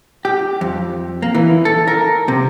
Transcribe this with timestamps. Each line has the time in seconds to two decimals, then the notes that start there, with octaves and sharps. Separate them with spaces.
0.25 G4
0.61 F2
1.22 A#3
1.35 E3
1.65 A4
1.88 A#4
2.28 C3